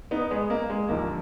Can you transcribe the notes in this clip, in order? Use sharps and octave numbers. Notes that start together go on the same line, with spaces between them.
B3 D#4
G#3 B3
A#3
G#3
D#2 D3 F3 A#3